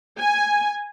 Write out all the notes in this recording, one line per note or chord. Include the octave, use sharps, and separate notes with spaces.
G#5